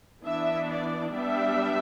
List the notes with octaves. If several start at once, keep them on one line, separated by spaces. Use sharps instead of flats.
E3 B3 D4 E5
D5
G3 B3 D4 E5